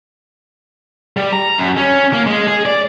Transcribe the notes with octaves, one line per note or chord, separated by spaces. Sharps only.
G3
A#5
F#2
C#4
A#3
G#3
G#4
D5